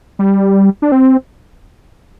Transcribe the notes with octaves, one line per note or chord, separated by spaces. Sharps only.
G3
D4
C4